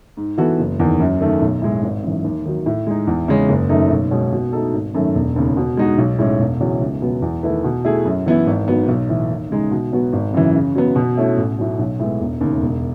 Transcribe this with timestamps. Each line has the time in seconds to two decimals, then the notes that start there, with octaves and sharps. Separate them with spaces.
0.17 G#2
0.38 E3 B3 F#4 A4
0.59 F#1
0.79 E2 D#3
1.00 F#2
1.21 D#3 A3
1.42 B1
1.62 A2 G#3
1.83 G#1
2.03 F#2 E3
2.24 D#2
2.45 D#3 F#3
2.66 A2
2.87 G#3 D#4
3.07 E2
3.28 C#3 G#3 C#4
3.49 F#1
3.69 F#2 D#3 A3 D#4
3.91 B1
4.11 B2 G#3 C#4
4.32 B2
4.53 A3 D#4 A4
4.73 G#1
4.94 F#2 D#3 A3
5.15 E1
5.36 D#2 C#3
5.57 B2
5.77 G#3 D#4 F#4
5.98 B1
6.19 A2 G#3 C#4
6.39 E1
6.60 E2 C#3 F#3 C#4
6.81 C#2
7.02 B2 F#3 B3
7.22 E2
7.43 D#3 A3 E4 B4
7.64 B2
7.85 A3 E4 G#4
8.05 F#2
8.26 E3 B3 E4
8.47 G#1
8.68 G#2 F#3 B3
8.88 B1
9.09 A2 E3
9.30 D#2
9.50 C#3 G#3 D#4
9.71 B2
9.92 F#3 B3 F#4
10.13 G#1
10.34 F#2 C#3 E3
10.54 C#3
10.75 F#3 B3
10.96 B2
11.17 A3 C#4 E4
11.37 A1
11.58 A2 F#3
11.79 B1
11.99 A2 G#3 B3
12.20 E1
12.41 D#2 C#3
12.62 E1